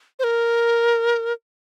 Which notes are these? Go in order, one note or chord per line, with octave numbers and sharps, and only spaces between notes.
C5
A#4